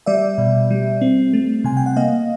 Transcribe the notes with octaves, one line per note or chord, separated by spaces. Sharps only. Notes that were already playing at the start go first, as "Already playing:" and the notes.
G3 D5 E5
B2
G3
C4
A3
C3 G#5
G5
F#5
A#3 D#5 F5